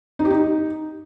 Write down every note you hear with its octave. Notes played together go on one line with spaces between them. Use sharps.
D#4
G4
D#4